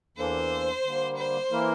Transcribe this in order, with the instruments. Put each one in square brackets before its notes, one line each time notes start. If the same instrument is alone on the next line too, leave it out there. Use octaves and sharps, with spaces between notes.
[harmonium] E2 E3 A#3 D4 A4 [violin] C5
[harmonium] D3 G3 A#3
[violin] C5
[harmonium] E3 A#3 E4 A#4